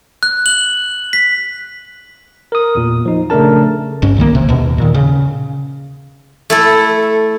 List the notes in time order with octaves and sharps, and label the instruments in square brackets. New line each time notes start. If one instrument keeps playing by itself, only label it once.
[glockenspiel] F#6
F#7
B6
[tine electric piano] A#4 D#6
E2 A#2
F3 D#4
C#3 A3 D4 A#4 A5
[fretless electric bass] A1 G2 C#4
C2 D#3 F#3 A#3
D#1 C3
D#2 B2
A#2 D#3
C#3
[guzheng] A3 E4 A4